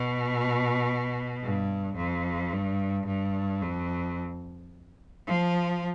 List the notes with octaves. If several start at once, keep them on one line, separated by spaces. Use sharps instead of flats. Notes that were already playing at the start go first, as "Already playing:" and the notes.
Already playing: B2
G2
F2
G2
G2
F2
F3